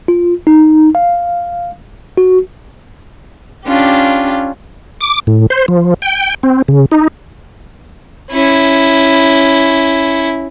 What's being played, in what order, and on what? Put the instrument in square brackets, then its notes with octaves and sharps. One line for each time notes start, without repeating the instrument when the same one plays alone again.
[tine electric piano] F4
D#4
F5
F#4
[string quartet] C#4 D4 F4 G4
[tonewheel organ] D6
A2
C5
F3
G5
C4
C#3
D#4
[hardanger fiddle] C#4 E4